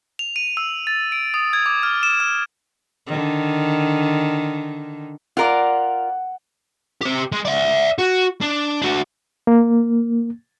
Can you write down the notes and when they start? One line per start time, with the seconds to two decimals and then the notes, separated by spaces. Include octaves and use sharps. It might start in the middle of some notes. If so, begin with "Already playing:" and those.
0.19 F7
0.36 D#7
0.57 E6
0.87 A6
1.12 D7
1.34 D#6
1.53 G#6
1.66 D6
1.83 F6
2.03 E7
2.20 F6
3.07 D3 D#3
5.37 F4 A#4 D5 F#5
7.02 G4 C5
7.32 G#3
7.45 D5 E5
7.98 F#4
8.42 D4
8.82 D4 F#4
9.47 A#3